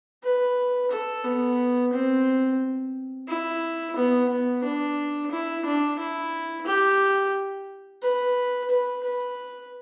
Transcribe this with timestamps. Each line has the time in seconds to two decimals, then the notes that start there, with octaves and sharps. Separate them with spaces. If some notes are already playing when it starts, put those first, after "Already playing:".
0.23 B4
0.91 A4
1.24 B3
1.93 C4
3.28 E4
3.96 B3
4.29 B3
4.64 D4
5.31 E4
5.65 D4
5.99 E4
6.67 G4
8.02 B4
8.70 B4
9.03 B4